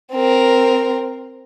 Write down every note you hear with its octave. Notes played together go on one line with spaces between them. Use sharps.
C4 A#4